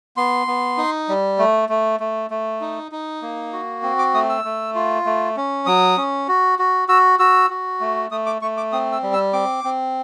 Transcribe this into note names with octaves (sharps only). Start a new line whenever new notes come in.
B3 C6
B3
D#4
G3
A3
A3
A3
A3
D#4
D#4
A#3
F#4
C4
D6
A3 D#6
E6
A3
F4
A3
C#4
F#3 D#6
C#4
F#4
F#4
F#4 E6
F#4 E6
F#4
A3
A3 D#6
D6
A3 C#6
D6
C4 D#6
E6
G3
E6
C4 D6
C4